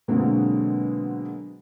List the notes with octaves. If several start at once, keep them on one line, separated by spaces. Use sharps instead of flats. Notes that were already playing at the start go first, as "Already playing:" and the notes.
B2 D3 F#3 G#3 A#3 C4